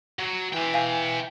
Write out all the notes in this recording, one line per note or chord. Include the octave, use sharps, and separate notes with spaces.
F#3
E3 E5 G5
F5 G#5